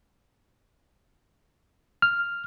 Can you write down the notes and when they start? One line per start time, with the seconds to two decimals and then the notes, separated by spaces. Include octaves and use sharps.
2.02 F6